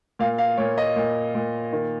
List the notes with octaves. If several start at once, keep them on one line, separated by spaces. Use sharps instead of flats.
A#2 F5
F5
A#2 C#5
D#5
A#2
A#2
D#3